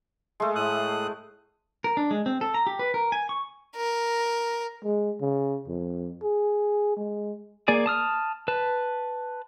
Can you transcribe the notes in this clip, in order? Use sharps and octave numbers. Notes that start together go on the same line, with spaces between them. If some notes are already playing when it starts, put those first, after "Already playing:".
G#3 A3
A2 D#6 F#6
A#4
D4
G#3
C4
A4
A#5
G4
B4
A#4
G#5
C#6
A#4
G#3
C#3
F2
G#4
G#3
A#3 G#4 D5 G#5
A5 D#6 F6
B4 A5